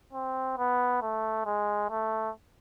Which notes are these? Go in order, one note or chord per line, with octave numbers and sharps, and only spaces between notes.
C4
B3
A3
G#3
A3